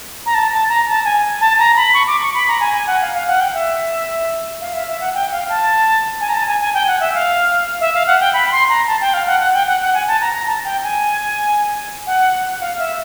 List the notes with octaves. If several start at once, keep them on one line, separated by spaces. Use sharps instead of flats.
A#5
A5
A5
A#5
A5
G#5
A5
A#5
B5
C#6
D6
C#6
B5
A#5
G#5
G#5
F#5
F5
F5
F#5
G5
E5
F5
E5
E5
F#5
G5
F5
A5
G#5
A#5
A5
G#5
G#5
G5
F#5
E5
F5
E5
F5
F#5
G5
B5
C6
A#5
A5
G5
F5
F#5
F#5
G5
F#5
F#5
G#5
A5
A#5
A#5
A5
G5
G#5
F#5
F5
E5